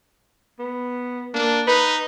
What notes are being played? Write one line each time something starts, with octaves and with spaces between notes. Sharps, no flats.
B3
A#3 D4
D#4 B4